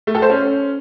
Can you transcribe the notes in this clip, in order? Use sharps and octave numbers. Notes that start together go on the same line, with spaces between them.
A3
A4
C5
C#4